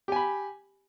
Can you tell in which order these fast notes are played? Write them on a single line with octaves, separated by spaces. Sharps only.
G4 G#5 B5